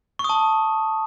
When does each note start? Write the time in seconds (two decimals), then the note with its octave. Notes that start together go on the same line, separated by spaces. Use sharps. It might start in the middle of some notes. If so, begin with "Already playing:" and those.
0.19 C#6
0.24 D#6
0.29 A5